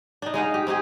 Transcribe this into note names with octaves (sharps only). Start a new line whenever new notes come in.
D4 D#4
G#3 D#4 F5 F#5
G4
C4 D#4 G4 G#4